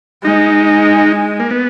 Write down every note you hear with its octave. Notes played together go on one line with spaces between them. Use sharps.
G#3 D#4
A#3
B3